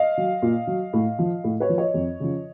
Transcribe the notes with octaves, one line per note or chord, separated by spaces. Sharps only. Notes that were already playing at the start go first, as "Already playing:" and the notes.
Already playing: D#5 F5
F#3
A#2
F#3
A2
F3
A2
B4 C#5
F3
C#5 D#5
F2
C#3 F3